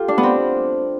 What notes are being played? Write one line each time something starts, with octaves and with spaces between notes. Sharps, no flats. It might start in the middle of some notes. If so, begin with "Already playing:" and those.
Already playing: F4 G4 A4
D4
B3
C4